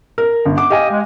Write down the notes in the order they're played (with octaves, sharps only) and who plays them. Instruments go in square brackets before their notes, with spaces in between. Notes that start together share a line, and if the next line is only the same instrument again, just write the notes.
[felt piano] A#4
G1
F#5 D6
[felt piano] G4 F5 G#5 [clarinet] D#5
[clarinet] G#3